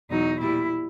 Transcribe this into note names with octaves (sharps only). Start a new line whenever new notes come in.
E2 B2 F#3 D#4
A#2 G3 E4